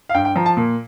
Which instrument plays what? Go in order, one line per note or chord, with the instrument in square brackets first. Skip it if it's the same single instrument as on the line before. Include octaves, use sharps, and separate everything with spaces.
[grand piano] F5
G2 G5
G5
F3 A#5
A5
A#2